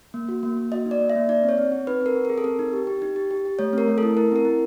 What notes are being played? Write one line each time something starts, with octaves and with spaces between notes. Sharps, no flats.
A#3
F#4
A#3
A#3
F#4 D#5
D#4
D5
A#3
E5
A#3
D#4 D5
C4
C#5
C4
C4
D#4 B4
C4 A#4
C4
A#4
G#4
A4
C4 A#4
D#4
G4
G4
D#4
G4
G4
G4
A3 C#5
C4 A#4
A3
A4
E4
E4 A#4
C4 A#4
E4